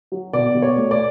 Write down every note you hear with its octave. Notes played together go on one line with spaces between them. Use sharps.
F#3
B2 D5
B2
C#5
A3
D5